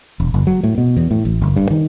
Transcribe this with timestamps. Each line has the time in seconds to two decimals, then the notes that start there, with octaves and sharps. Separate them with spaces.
0.20 E1
0.34 F#1
0.47 F#3
0.64 A2
0.78 B2
0.97 E2
1.11 A2
1.25 A1
1.42 F#1
1.56 G2
1.70 D#3